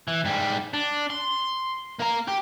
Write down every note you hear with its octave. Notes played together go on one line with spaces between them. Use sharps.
E3
G#2 G3
D4
C6
A#3 A#5
G4